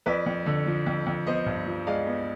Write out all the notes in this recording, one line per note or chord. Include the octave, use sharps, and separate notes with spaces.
F2 B4 D5
F2
D3
F3
F2
F2
B3 C5 D#5
G2
F3
G#3 D5 F5
B3